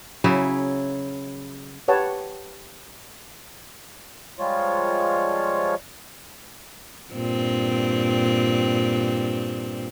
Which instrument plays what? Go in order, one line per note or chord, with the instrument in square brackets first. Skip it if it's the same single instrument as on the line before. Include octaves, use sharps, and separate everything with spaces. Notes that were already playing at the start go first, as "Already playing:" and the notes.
[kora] C#3 F#3 E4 G#4
[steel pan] G4 B4 C#5 F#5 G5 A5
[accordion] F3 G3 G#3 F4 C#5
[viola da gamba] G2 A#2 C4